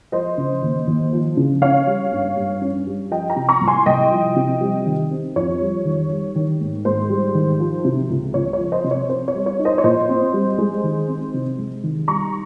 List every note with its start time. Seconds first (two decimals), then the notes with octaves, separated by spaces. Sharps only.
0.12 F3 C5 D#5
0.38 C#3
0.62 D#2
0.87 D#2
1.13 F3
1.37 C#3
1.62 C#4 C#5 F5
1.87 G3
2.12 G2
2.37 G2
2.61 C#4
2.87 G3
3.11 F3 D#5 G5
3.30 G5 A#5
3.36 C3
3.49 A#5 C#6
3.61 C2
3.67 G#5 C6
3.86 C2 D#5 G5
4.11 F3
4.36 C3
4.61 G3
4.86 D#3
5.11 C4
5.36 F2 C#5
5.61 G3
5.85 D#3
6.10 G3
6.35 D#3
6.60 G#2
6.85 G#2 C5
7.10 G3
7.35 D#3
7.60 F3
7.85 C3
8.10 C#2
8.34 C#2 C#5
8.53 C#5
8.59 F3
8.72 C5 D#5
8.84 C3
8.91 C#5
9.09 C4 C5
9.28 C#5
9.35 G3
9.46 C#5
9.59 D#4
9.65 C5 D#5
9.78 C#5
9.84 A#2 C5 D#5
10.09 C4
10.34 G3
10.58 G#3
10.83 D#3
11.08 C4
11.34 C3
11.58 G#3
11.83 D#3
12.08 G3 A#5 C#6